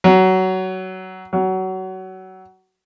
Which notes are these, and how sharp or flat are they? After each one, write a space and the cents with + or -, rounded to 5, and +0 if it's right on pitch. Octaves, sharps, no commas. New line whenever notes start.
F#3 +20
F#3 +25